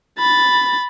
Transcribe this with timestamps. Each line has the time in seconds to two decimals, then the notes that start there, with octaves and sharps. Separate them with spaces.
0.19 B5 A6